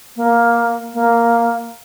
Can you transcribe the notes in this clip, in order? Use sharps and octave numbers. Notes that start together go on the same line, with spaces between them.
A#3
A#3